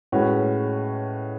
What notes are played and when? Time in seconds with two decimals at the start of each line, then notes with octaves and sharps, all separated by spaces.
0.12 A2 G#3 C#4 F#4 B4